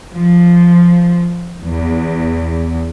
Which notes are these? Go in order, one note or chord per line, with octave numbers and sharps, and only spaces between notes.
F3
E2